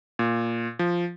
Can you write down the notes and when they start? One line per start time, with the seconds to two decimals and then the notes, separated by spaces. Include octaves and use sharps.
0.19 A#2
0.79 F3